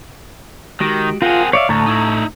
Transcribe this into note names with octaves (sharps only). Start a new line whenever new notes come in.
D#3 G#3 F#4 G4
C4 F4 G#4 A#4 F#5
C#5 D5 E5 F5
D2 A2 A4 A5 A#5 C#6
D#4 E4